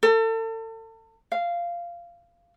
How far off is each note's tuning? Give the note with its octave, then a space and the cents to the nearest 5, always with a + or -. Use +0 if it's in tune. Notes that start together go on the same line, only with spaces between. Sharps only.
A4 +35
F5 -15